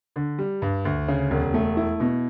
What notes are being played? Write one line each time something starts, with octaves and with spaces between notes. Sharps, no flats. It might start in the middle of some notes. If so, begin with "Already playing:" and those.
D3
G3
G2
D2
C#3
E1
A3
E4
B2